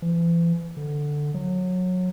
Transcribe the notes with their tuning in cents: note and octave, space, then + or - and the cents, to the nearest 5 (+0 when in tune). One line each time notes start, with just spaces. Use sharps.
E3 +40
D3 +5
F#3 -20